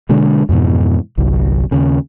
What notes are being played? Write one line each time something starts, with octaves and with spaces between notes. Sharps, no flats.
B2 D3 G#3 D4
F2 G#2 B2 E3
G1 C2 F#3
D#2 C#3